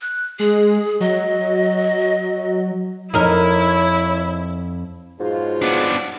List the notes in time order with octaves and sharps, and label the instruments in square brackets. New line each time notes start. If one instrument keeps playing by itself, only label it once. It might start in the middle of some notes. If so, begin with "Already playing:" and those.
[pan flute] F#6
[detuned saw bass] G#3 [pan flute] G#4
[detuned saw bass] F#3 [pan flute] D#5
[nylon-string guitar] F2 [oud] D#4 A#4 [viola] E4 [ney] C#5
[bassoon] G#2 [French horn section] B2 F#3 F4
[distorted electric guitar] B3 D4